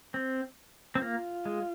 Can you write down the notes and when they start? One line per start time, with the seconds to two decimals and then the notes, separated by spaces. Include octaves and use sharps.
0.14 C4
0.95 C4
1.02 A#3 F4
1.45 G#3